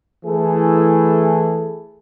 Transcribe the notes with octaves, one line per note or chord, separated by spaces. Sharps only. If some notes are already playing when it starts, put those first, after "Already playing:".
E3 A3 E4 G#4 A4